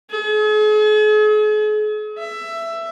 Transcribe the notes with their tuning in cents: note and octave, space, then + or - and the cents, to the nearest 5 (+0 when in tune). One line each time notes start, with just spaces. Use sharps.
G#4 +40
E5 +15